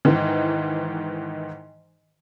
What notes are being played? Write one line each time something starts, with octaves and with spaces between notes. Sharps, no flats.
G#2 D#3 E3